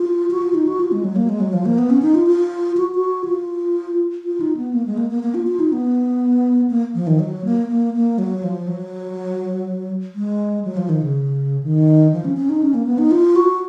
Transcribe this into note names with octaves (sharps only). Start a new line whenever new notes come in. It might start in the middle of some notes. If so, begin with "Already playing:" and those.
Already playing: F4
F#4
F4
D#4
F#4
F4
G#3
F#3
A#3
G#3
F#3
F3
A#3
B3
C#4
D#4
F4
F4
F#4
F#4
F4
F4
D#4
B3
A#3
G#3
A#3
A#3
A#3
F4
F4
D#4
B3
A#3
F3
D#3
F#3
A#3
A#3
A#3
F#3
F3
F#3
G#3
F#3
F3
D#3
C#3
D#3
F3
C#4
C#4
D#4
C#4
A#3
B3
D#4
F4
F#4